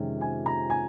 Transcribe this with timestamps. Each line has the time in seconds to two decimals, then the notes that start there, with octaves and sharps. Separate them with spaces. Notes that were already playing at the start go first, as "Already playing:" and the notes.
Already playing: F2 C3 D#3 G#3 C#4
0.21 G#5
0.46 A#5
0.70 G#5